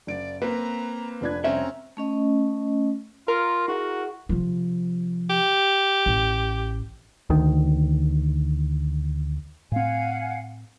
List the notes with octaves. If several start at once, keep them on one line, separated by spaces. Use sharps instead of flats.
F#1 D5 D7
A#3 C4 B4 A#5
F1 D4 B4 G#6
C2 C4 C#4 E5 A#5
A3 C#4 D#5
F4 A#4
E4 F#4 G#4 F#5
C3 F3
G4
A1
D2 D#3
A2 C4 F5 F#5 G#5